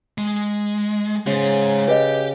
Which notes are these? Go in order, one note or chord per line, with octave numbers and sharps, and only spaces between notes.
G#3
C#3 G#3 C5
G4 B4 D#5